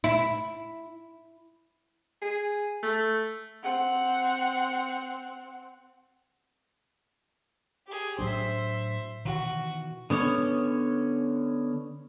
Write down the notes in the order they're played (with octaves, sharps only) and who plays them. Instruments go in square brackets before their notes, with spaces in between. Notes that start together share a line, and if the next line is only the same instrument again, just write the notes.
[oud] E4
[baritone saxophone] G#4
A3
[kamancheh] C4 F#5
[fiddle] G4 G#4
[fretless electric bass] A2 F#3 D4 [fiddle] C5 E5
[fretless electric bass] B2 D#3 E3 [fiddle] F#4
[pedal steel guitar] D3 B3 C#4 C#5